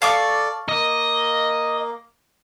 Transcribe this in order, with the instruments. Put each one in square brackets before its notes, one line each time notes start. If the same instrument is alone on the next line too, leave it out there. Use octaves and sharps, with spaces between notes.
[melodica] A4 D5 [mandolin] F5 C#6 D6
[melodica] A#3 [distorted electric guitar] D#5